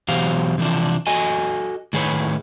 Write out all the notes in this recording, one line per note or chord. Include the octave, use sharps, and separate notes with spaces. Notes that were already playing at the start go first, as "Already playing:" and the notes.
B2 E3 F#3 G4 C5 F5
C3 E3 F3 D4
F#4 A4 D#5 G#5
A2 D#3 G#4 B4 C#5